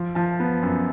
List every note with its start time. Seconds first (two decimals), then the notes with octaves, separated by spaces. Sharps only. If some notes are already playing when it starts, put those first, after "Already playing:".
Already playing: F3
0.15 F3 A5
0.40 B3
0.63 F#2